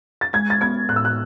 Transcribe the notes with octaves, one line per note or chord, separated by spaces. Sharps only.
A6
G#3 G#6
A6
B3 G#6
A2 F#6
E6
F#6